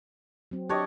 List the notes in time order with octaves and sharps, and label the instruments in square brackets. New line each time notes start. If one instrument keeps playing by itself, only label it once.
[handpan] F#3 C4
[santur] D4 C#5 D#5 [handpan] G4